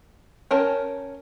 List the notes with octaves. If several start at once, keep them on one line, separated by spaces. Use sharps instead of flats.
C#4 A#4 G5 A5